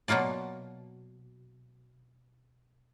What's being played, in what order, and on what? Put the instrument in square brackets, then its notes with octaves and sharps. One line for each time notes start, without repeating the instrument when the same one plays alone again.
[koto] B2 F#3 A#3 F4 D5